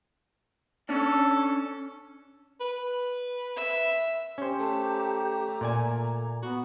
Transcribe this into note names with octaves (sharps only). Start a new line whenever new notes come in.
C#4 D4 A4
B4
E5
C#4 G4 C5
A3 A5
A#5
A#2 D5 G#5
B3 F#4